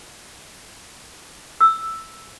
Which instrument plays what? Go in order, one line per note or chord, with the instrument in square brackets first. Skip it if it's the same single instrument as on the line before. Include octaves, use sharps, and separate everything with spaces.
[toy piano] E6